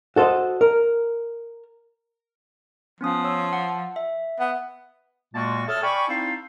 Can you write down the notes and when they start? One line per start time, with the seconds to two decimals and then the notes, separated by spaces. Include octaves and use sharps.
0.16 F#4 A4 C5 D#5
0.61 A#4
3.01 F3 B3 C#4 D#6
3.24 C#5 E6
3.53 F#5
3.96 E5
4.40 B3
5.34 A#2 G#3 A#3 F#4 A5 C#6
5.67 A4 C#5 E5 A5 D#6 F6
5.83 D5 G5 G#5 B5 C#6
6.08 C4 D#4 E4 A4 C5 F5